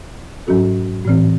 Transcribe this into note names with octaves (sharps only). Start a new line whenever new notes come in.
G#2 F#3 C#4 F#4 A4
A2 E3 C4